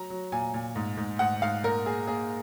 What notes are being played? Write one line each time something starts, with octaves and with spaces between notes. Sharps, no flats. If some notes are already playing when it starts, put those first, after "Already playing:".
Already playing: F#3 A#5
F#3
A#2 G#5
A#2
G#2
G#2
G#2 F#5
G#2 F5
A#2 A#4
A#3 G#4
A#3 G#4